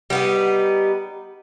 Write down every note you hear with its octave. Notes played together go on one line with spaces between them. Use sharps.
G3 B3 D#4